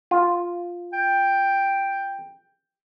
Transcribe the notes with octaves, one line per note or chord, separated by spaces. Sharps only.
F4
G5